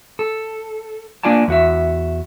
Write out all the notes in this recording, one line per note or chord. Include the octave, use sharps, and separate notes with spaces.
A4
A#3 D4 F4 D5 G#5 A5
E2 F#4 E5